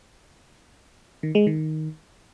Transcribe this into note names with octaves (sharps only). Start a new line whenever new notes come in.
D#3
G#3
D#3